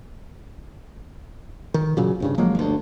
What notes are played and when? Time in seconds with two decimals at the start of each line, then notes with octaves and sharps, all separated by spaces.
1.74 D#3
1.97 A#2 C#3 F#3
2.20 C2 G2 C#3
2.38 F3 F#3 G#3 A#3
2.55 G1 D2